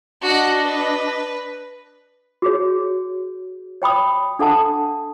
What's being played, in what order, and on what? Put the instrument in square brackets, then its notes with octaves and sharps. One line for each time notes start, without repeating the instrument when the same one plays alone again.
[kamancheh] D4 D#5 [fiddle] F#4 F#5
[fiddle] B4
[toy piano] F#4 G#4 C#5
C#5 G5 B5 D#6
D4 A4 F#5 A5 D#6